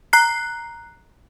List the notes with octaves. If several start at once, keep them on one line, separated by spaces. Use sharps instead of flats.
A#5 F#6 C7